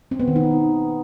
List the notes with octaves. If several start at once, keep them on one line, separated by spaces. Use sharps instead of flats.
C4
B3
D#3
D#4
C4